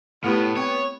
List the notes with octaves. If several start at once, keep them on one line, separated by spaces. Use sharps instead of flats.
A2 A3 B3 E4 G4
C4 C#5 G5